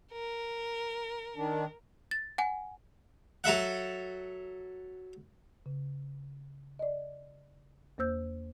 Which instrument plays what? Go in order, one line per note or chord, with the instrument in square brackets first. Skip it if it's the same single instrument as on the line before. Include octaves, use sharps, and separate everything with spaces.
[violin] A#4
[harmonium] D#3 D4
[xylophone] A6
F#5 G#5
[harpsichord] F#3 A4 E5 F#5
[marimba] C#3
D5 D#5
E2 A#3 C5 E6 G6